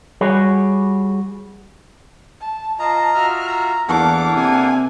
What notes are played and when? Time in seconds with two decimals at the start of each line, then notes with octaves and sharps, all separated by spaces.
0.21 G3 F#4 G#4 C#5
2.41 A5
2.79 F4 D#5 A5 A#5
3.15 F4 F#4 E5 F6
3.48 A#5
3.89 E2 A#3 D4 A4 F5 F#5 D6
4.36 C3 G#5